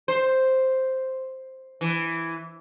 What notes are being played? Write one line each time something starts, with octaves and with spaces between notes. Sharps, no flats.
C5
E3